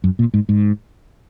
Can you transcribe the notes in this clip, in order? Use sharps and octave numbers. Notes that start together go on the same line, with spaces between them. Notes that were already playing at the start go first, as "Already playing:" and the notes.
F#2
A#2
G#2
G#2